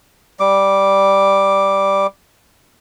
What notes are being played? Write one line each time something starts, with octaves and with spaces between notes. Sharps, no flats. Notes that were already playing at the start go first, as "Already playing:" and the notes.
G3 D6